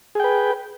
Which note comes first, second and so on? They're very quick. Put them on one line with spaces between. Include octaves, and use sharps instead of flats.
G#4 G5 B4